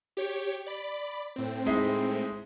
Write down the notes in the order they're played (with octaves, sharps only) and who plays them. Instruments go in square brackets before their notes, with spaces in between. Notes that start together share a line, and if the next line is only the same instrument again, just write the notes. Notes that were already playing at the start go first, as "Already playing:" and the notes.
[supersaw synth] G4 C#5
D5 B5
A2 C4
[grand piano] G#3 D#4 E4